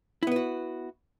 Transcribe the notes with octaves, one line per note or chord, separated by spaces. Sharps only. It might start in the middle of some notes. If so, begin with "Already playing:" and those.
B3 E4 F#4 B4